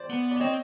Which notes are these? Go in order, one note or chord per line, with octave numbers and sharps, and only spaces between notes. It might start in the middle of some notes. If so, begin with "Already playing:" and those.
Already playing: C5 D5
B3
D5
C4 C#5 D#5